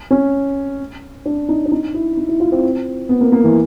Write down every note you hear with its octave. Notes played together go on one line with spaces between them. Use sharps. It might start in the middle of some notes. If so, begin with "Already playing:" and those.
C#4
D4
D#4
D4
D#4
E4
D#4
E4
F4
C4
B3
A#3
A#3
E3